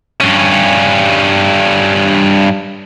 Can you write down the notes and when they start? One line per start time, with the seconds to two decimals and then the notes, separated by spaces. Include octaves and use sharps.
0.21 G2 C#4